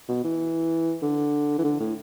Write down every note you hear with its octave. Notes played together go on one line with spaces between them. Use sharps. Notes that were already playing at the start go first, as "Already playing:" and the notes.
B2
E3
D3
E3
D3
A2